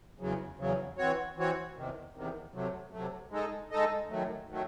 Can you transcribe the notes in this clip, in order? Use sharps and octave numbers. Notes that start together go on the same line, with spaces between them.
E2 C#3 F#3
E2 C#3 F#3
E3 C4 F#4 C#5
E3 C4 F#4 C#5
E2 C3 D#3
E2 C3 D#3
C3 F#3 A3
C3 F#3 A3
G#3 D#4 A4 D#5
G#3 D#4 A4 D#5
F#2 D#3 F#3 A3
D#3 F#3 A3